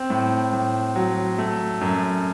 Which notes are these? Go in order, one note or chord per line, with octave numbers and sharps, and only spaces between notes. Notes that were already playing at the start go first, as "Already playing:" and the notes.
Already playing: C4
A2
A2
F#3
A3
F#2